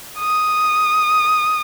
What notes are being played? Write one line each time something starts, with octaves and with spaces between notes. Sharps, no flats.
D#6